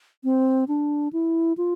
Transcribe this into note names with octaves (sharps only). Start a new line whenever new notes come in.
C4
D4
E4
F4